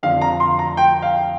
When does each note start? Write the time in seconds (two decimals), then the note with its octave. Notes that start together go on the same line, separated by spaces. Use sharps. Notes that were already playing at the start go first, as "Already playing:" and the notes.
0.03 F2 D3 F5
0.21 A#5
0.40 C6
0.59 A#5
0.77 G5
1.02 F5